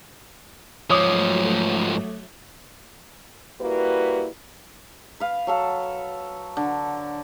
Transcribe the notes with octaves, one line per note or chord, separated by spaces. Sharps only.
G#2 F3 F#3 A3 C#5 D6 D#6
G3 A#3 E4 F#4 B4
B4 F5
F#3 A4 F5
D3